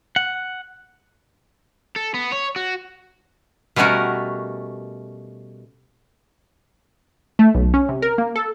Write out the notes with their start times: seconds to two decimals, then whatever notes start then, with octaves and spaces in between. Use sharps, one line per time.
0.16 F#5
1.96 A4
2.14 B3
2.32 C#5
2.56 F#4
3.76 B2 G3 A3 C#4 F#4 A#4
7.39 A3
7.54 B1
7.74 C#4
7.89 C3
8.02 A#4
8.18 A#3
8.36 A4